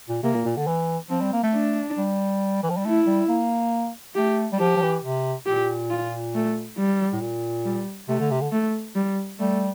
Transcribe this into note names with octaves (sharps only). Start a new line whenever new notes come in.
A#2
C3 A#3
A#2
A#2
D3
E3
F3 C4
G3
A#3
A3
D4
G3
E3
F3
G3
A3 E4
G3
A#3
A3 G4
G3
F3 G4
F3
E3
C3
A#2 G4
F4
A3
G3
A2
A#2
G3
C3 A3
D3
C3
D3
A3
G3
G3 A3